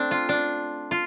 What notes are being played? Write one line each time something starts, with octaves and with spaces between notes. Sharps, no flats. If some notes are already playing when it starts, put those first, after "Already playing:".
Already playing: A3 C4 D4
F4
D4
F4